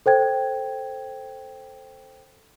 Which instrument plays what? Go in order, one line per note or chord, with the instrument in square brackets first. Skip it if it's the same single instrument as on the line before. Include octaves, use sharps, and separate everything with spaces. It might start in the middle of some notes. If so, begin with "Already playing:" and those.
[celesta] A4 C5 G5 G#6